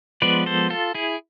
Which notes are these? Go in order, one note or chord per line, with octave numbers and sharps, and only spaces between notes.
F3 G#3 B3 B4 D5
A4 C5
F4 A4
E4 G#4